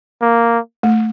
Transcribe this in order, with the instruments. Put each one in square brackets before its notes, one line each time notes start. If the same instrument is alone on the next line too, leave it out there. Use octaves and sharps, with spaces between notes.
[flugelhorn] A#3
[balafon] A3